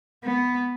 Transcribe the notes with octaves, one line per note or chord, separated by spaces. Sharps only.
B3